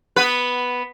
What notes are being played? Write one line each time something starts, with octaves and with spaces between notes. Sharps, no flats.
B3 B4